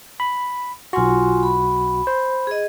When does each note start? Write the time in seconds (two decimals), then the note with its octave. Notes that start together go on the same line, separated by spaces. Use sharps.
0.20 B5
0.93 B1 F4 F#4 G#5 C6
1.43 B5
2.07 C5
2.47 G#4 D#5